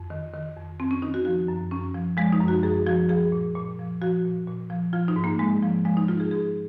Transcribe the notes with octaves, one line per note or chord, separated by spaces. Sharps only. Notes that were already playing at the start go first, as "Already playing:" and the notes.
Already playing: F2
D#3
D#3
F2
F2 C4
C#4
D#3 D#4
F#4
F3 F#4
F#2
F#2 C#4
F3
F3 G#3
D#4
F#2
F#4
F#2 G#4
F3 F#4
F3 G#4
A#2
A#2
F3
F3 F#4
A#2
A#2
F3
F3 F4
D#4
G#2
A#3
G#2 G#3
F3
F3 G#3
D#4
G#2 F4
G#4
G#2 G#4